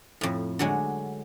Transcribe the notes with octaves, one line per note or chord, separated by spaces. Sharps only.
F2 A2
D3 F#3 G#3